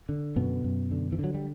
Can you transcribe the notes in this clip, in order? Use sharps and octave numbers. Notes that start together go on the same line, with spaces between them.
D3
F#2 B2 B3
F#2
D3
E3
D3
F#3
G3